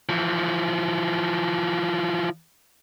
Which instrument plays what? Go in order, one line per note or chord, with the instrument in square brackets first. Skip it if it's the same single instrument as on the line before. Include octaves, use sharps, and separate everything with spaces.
[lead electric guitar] E3 F3